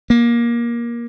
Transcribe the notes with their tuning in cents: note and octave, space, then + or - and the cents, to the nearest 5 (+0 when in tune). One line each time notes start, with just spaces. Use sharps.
A#3 +20